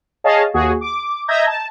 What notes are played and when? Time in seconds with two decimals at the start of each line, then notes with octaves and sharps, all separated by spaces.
0.24 G#4 C#5 D#5 F5 A5
0.54 D#2 F#4 G#4
0.81 D6
1.28 D#5 E5 A#5 G6 G#6 A#6
1.46 A5